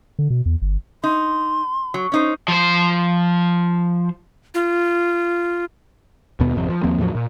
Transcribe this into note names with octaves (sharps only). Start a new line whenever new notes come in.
D3
B2
E2
G1
D#4 C6
F#3
C#4 D#4 C5
F3 C5
F4
D#2 B2 B3
G#1 F2 C3
F3
D#2 F3 A#3 C4
E2 A2 F3 F#3
A#2